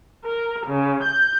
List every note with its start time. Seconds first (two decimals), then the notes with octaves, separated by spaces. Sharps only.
0.24 A#4
0.67 C#3
1.03 G6